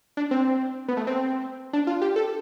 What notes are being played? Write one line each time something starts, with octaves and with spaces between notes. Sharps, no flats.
D4
C4
B3
A3
C4
D4
F4
G4
A4